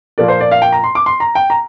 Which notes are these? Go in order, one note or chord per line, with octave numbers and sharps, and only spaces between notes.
A#2 F3 A#3 F4 D5
C5
D5
F5
G5
A#5
C6
D6
C6
A#5
G5
A#5